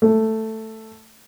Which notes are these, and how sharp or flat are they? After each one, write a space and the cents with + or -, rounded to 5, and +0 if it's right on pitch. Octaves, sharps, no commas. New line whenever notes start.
A3 +5